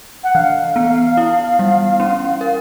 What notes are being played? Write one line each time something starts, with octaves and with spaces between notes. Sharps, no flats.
F#5
E3 F5
B3
E4
G3
C#4
A#4